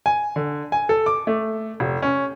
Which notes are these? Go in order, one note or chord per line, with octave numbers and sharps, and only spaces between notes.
G#5
D3
G#5
A4
D6
A3
F1
C#4